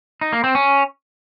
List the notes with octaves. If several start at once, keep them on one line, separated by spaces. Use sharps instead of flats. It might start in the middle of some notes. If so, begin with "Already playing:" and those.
D#4
A#3
C4
C#4